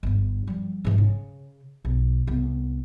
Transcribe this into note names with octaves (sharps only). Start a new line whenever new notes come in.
G1 G2
F3 G3
G#2 E3
C#3
B1
C2 B3